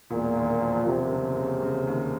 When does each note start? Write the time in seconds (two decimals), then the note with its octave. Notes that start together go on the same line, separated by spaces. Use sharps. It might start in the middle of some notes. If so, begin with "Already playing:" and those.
0.11 E1 A#2
0.36 D#2
0.62 F3
0.87 C3 F3
1.12 C#3
1.37 C#3
1.62 C#3
1.87 D#2